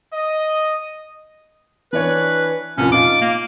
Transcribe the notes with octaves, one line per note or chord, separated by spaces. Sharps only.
D#5
E3 D4 B4 C#5
C2 F2 A#2 C#4
D#4 F4 D6
A#3